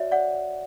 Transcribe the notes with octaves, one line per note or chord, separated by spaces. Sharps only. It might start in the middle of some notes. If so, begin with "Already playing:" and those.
Already playing: F#4 C#5 D5 E5
D5 F#5